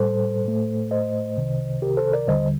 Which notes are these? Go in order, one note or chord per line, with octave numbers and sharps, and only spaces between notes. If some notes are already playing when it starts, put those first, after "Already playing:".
Already playing: A2 G3 A4 C5
A2 A3
C5 D#5
C2 C3 D#3
G4 A#4
A4 C5
A#4 D5
D#2 D3 G3 C5 D#5